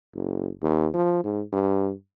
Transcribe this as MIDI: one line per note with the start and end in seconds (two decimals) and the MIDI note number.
0.15 0.50 30
0.63 0.88 39
0.94 1.21 53
1.24 1.42 44
1.53 1.92 43